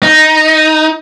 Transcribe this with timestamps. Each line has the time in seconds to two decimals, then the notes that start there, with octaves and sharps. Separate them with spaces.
0.03 D#4